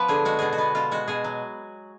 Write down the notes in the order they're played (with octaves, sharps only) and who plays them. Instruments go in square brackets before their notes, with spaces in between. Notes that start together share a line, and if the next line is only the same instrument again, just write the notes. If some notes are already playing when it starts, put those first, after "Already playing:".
Already playing: [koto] F3 B3 B4
D3 G#4
G#3 F#4
B2 G#4
F#4
B3
B2 F4
G#3 F#4
B2 G#4
F#3